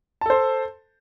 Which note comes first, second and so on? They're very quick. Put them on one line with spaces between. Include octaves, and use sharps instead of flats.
A5 A4 C5